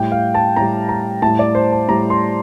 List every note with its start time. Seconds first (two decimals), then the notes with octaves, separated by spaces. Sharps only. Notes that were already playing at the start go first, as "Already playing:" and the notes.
Already playing: A2 G3 G5
0.12 F5
0.35 A5
0.56 A2 G3 A#5
0.89 A#5
1.22 A2 G3 A5
1.39 D5
1.55 C5
1.72 A5
1.88 A2 G3 A#5
2.10 C6